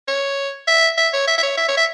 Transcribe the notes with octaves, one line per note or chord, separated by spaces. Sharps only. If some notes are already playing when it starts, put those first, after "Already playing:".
C#5
E5
E5
C#5
E5
E5
C#5
E5
C#5
E5